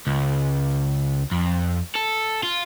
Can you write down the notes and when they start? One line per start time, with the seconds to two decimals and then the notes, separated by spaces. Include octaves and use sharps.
0.07 C#2
1.31 F2
1.96 A4
2.43 F4